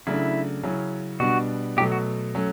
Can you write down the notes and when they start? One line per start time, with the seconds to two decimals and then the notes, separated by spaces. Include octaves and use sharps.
0.07 C#3 F#3 A3 D4 E4
0.63 C#3 F#3 C#4 E4
1.20 B2 G3 B3 D4 F#4
1.77 B2 F#3 A3 G4
1.92 F#4
2.35 F#3 A3 C#4